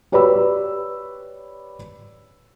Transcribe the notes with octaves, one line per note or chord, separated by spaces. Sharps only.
G4 B4 C#5 D5 B5 E6